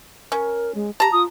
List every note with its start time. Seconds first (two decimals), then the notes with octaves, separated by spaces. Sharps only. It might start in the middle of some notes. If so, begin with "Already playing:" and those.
0.32 C#4 A#4
0.75 G#3
1.00 G4 A5 A#5
1.12 F4 D#6